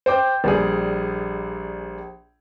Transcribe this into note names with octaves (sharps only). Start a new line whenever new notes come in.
C5 G5 D6 G6
A#1 G3 G#4